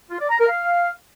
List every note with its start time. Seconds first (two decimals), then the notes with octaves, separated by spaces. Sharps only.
0.10 F4
0.20 D5
0.29 A#5
0.39 A#4
0.48 F5